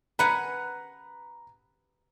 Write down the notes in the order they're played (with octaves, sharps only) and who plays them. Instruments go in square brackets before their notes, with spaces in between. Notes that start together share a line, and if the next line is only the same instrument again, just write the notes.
[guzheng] B4 F#5 G#5 [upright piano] A#5 B5